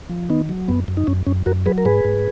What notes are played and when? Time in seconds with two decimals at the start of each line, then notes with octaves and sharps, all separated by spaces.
0.09 F3
0.30 D#3 B3 D#4
0.49 F#3
0.68 F#2 B3
0.88 F#2
0.97 D#4
1.07 F#2 C#4
1.27 F#2 C#4
1.46 F#2 F#4 A#4
1.66 F#3 G#4 B4
1.78 A#4
1.85 G#2 G#4 B4
2.05 G#2